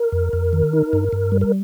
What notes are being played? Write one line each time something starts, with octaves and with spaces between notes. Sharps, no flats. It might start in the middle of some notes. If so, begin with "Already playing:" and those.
Already playing: A#4
F2
F2
D#3
D#4
G2
G2
G3
A#4